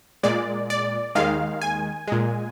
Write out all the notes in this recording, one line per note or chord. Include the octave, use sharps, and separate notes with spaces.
A#2 G#3 D5
D5
D#2 D#3 G#3 F5
G#5
A#2 G#3